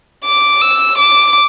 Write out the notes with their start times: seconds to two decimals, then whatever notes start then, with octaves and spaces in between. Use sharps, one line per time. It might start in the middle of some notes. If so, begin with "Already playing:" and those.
0.25 D6
0.61 E6
0.98 D6